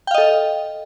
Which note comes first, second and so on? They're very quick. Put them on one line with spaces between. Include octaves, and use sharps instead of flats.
G5 F5 D#5 A4